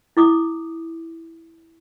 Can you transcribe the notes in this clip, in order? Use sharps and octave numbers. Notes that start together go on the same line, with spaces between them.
E4 D6 D#6